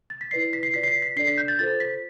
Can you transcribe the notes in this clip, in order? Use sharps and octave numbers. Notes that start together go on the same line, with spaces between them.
A6
B6
E4 B4 D5 C7
B6
C7
F4 B4 D5 B6
C7
B6
B6
D4 A4 D5 C7
B6
G6
A6
F4 A4 C5 A6
B6